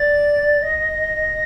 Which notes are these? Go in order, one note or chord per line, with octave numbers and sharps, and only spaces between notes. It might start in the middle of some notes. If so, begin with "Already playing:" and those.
Already playing: D5 A6
D#5 A#6